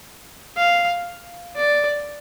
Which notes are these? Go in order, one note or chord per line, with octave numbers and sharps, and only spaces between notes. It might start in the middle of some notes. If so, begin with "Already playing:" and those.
F5
D5